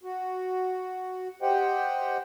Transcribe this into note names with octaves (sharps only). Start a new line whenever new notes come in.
F#4
G4 C5 D#5 F#5 G5